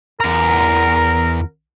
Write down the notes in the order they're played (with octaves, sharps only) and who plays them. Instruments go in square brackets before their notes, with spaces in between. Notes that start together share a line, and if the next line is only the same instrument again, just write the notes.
[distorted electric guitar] E2 A#5 [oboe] A#4